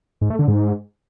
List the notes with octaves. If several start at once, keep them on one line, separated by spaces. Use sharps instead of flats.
G#2
A3
D3
G#2